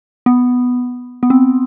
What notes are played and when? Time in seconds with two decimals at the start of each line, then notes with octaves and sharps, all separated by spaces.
0.26 B3
1.23 B3
1.30 C4